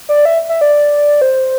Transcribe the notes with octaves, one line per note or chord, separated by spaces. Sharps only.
D5
E5
E5
D5
C5